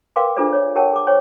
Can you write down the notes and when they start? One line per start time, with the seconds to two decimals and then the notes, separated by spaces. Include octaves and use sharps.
0.16 A#4 B4 F5 G5 C6 D6
0.36 D4 F4 G#4 A4 C5 D5
0.52 C#5 D5
0.75 G4 A#4 C#5 F#5 G5 A5
0.93 G#4 D6
1.07 C5 C#5 G5 C#6